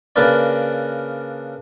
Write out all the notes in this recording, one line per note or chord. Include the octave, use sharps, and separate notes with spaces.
C#3 A#3 D4 A#4 B4 D5